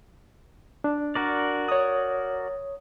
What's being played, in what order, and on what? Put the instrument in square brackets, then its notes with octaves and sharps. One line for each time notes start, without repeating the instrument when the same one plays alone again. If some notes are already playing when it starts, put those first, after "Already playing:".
[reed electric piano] D4
[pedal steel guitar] F#4 A#4 D5
[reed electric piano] C#5 D#6